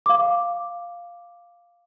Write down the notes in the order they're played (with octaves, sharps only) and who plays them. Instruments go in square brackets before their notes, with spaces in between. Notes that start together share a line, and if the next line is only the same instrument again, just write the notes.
[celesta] F5 D6